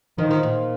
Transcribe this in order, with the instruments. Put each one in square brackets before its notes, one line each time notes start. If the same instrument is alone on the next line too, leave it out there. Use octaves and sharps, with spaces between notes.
[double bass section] D#3 [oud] F3
[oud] F3
A#2